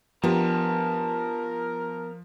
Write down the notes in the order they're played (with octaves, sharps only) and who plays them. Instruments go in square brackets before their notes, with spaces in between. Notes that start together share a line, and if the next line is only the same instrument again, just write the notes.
[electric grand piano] F3 [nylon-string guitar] B3 D4 G4 [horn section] A#4 [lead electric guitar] A5 A#5